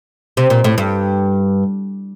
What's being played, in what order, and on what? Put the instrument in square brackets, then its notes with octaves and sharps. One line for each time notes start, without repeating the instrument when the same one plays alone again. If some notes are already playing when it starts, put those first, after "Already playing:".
[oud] C3
A#2
A2
G2